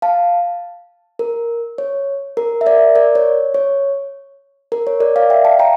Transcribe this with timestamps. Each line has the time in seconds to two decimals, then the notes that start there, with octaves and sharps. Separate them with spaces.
0.02 F5 A5
1.19 A#4
1.78 C#5
2.37 A#4
2.61 E5
2.66 A#4 D5
2.95 A#4 D5
3.15 C#5
3.54 C#5
4.72 A#4
4.87 C#5
5.00 A#4 D5
5.16 D5 F5
5.30 E5 G5
5.45 F5 A5
5.59 G5 A#5